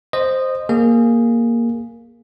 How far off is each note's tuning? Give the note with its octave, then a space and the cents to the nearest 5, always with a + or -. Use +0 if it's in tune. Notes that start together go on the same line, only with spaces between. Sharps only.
C5 +0 D#5 -15
A#3 +0 G#4 +0